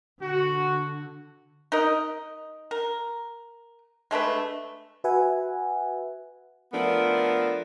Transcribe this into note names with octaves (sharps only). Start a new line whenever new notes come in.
D3 F#4
D#4 A#4 D#5
A#4
G#3 A3 D4 B4
F#4 B4 E5 F#5 G#5
F3 A3 B3 D4 A#4